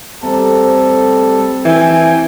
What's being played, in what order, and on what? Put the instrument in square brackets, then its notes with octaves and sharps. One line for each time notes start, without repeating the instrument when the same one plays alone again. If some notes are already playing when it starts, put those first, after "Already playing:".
[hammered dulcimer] C3 A3 A#5 [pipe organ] G3 A4
[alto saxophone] E3 [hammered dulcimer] F5 [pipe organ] G5 G#5